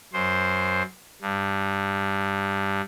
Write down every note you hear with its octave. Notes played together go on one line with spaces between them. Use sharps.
F#2 C5
G2